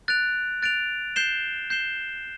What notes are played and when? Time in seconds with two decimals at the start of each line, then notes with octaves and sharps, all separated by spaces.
0.08 F#6 A6 D7 F7
0.62 F#6 A6 D7 F7
1.16 G6 C7 E7 G7
1.70 G6 C7 E7 G7